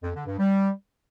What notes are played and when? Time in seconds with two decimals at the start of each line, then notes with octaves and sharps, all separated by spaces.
0.03 F2
0.15 D3
0.26 G2
0.38 G3